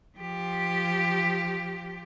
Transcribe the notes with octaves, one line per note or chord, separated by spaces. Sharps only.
F3 G4